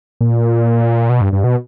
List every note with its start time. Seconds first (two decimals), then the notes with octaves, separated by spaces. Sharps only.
0.21 A#2
1.10 B2
1.21 G2
1.33 G2
1.44 B2